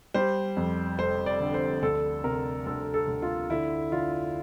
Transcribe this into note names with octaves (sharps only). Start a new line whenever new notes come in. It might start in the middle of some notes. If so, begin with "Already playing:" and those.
G3 C5
F2
F1 C5
D5
D3
C5
D2 A4
C3 A#4
D2 A4
A4
D2
F4
D3 E4
D3 F4